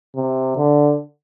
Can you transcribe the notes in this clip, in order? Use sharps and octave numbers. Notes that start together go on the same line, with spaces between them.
C3
D3